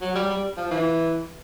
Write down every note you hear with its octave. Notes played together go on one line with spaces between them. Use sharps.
F#3
G3
G3
F3
E3